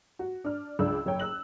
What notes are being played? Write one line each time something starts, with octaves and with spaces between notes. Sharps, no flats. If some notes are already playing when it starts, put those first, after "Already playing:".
F#4
D4 F6
C#2 D4 E6
F#1 C#5 G5
E6 F#6 F#7